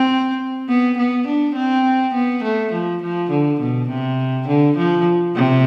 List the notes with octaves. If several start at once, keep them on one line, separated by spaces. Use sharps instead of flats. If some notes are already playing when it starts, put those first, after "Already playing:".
Already playing: C4
B3
B3
D4
C4
B3
A3
F3
F3
D3
B2
C3
D3
F3
C3